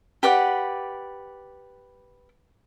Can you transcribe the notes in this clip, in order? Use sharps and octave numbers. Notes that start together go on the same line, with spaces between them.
G4 B4 D5 F#5